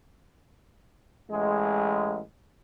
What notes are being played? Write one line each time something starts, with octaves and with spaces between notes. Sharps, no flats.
A1 G#3